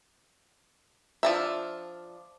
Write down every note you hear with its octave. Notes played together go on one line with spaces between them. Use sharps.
F3 D4 E5